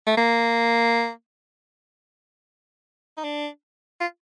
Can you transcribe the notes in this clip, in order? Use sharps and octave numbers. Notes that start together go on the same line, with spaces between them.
A3
A#3
D#4
D4
F4